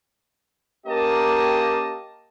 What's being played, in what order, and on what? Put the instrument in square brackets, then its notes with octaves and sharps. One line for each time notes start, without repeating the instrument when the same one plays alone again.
[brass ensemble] A#3 C#4 G4 A#4 D#5 A5